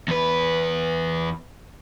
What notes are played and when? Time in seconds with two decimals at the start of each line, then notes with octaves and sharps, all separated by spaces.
0.08 E2 B4